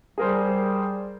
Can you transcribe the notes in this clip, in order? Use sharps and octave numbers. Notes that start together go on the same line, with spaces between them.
G3 G#4 A#4 C5